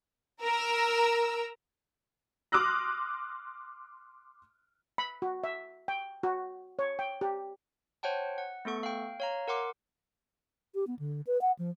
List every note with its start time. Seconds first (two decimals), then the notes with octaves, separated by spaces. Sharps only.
0.41 A#4 A#5 E6
2.52 C6 D6 D#6 F6 F#6 A#6
4.98 B5
5.22 F#4
5.44 E5
5.88 G5
6.23 F#4
6.79 C#5
6.99 G5
7.21 G4
8.03 C5 C#5 F#5 G5 A5
8.38 F#5
8.65 A3 B3 A4 C#6
8.83 F5 G5
9.20 C#5 F5 A#5
9.48 A#4 F#5 C6 D6
10.75 G4
10.87 B3
10.99 D3
11.27 B4
11.41 F#5
11.58 F3